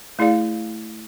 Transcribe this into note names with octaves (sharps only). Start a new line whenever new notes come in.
A3 E4 G#4 D5 F5